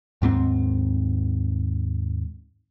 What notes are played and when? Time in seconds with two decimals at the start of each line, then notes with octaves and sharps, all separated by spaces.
0.22 D#2 G#2 B3 C4